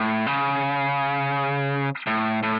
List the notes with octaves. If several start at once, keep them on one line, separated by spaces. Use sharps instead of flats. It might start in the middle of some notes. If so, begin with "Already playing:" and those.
Already playing: A2
C#3
A2
A2